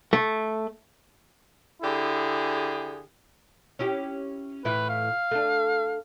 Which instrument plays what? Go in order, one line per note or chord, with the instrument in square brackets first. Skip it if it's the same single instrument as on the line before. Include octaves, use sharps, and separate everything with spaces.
[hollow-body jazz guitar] A3
[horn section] D3 E4 G4 G#4
[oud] C#4 E4 G4
[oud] A2 E3 E4 [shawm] B4
[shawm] F5
[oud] A3 D4